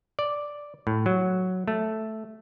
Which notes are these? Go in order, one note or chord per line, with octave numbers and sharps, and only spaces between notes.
D5
A2
F#3
A3